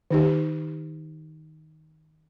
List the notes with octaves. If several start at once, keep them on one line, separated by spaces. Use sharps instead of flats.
D#3 D#4 G4